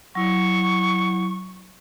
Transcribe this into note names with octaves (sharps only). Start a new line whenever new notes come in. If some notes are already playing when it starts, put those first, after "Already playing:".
F#3 E4 C#6